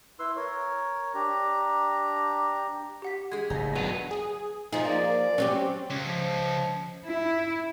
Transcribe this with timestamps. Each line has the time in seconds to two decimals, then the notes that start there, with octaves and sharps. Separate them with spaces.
0.19 E4 B4 C6 E6
0.36 A#4 C#5
1.15 D4 G4 A#5
3.02 G4 F#5 B6
3.32 G#3 G#4 G#6
3.50 F#1 A2 D#4
3.75 D#3 F#3 B3 D4 F#5 D#7 F7
4.11 G#4
4.73 F3 D#4 G#4
4.85 A#3 D5
5.38 F#3 C4 C#4 G4
5.91 C#2
6.07 F3
7.06 E4